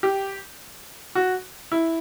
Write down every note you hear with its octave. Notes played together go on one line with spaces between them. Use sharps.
G4
F#4
E4